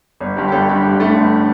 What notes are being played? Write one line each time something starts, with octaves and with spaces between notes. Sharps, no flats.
G1
G2 D3 G4
G4
G1 A4
G2 D3 G4
G1 G3
G2 D3 A3
G1
D3